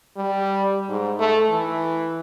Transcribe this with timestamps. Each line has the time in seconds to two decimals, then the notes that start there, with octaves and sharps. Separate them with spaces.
0.17 G3
0.89 G#2
1.19 A3
1.50 E3